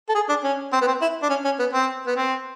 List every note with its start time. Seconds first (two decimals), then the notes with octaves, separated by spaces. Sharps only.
0.09 A4
0.15 G#4
0.29 D4
0.44 C#4
0.72 C4
0.81 B3
0.87 C4
1.01 E4
1.23 D4
1.29 C#4
1.44 C#4
1.59 B3
1.73 C4
2.07 B3
2.16 C4